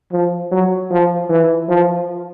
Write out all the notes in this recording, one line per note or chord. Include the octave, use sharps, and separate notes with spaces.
F3
F#3
F3
E3
F3